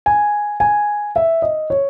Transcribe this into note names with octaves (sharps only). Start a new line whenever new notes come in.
G#5
G#5
E5
D#5
C#5